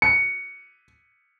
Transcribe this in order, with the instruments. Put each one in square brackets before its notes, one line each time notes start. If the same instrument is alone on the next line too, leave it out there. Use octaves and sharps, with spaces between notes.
[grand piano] C#7